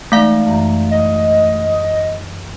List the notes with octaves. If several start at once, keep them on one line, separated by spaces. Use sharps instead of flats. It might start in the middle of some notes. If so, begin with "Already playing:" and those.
E3 G#3 A3 D#4 F5
F#2 E3 A#5
D#5